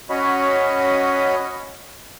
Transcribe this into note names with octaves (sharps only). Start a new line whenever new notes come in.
C#4 F#4 C#5 D#5 B5